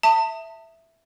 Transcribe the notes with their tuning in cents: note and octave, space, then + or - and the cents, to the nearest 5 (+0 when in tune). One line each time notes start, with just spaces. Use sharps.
E5 +0 A5 +35 D#6 +0